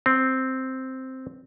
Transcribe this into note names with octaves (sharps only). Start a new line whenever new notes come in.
C4